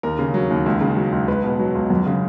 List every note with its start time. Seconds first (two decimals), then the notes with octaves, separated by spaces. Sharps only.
0.03 D#2 A#4
0.19 C#3
0.34 F#3
0.50 D#2
0.66 C#2
0.81 C#3
0.97 F#3
1.12 C#2
1.28 C#2 B4
1.44 B2
1.59 F#3
1.75 C#2
1.90 F#2
2.06 C#3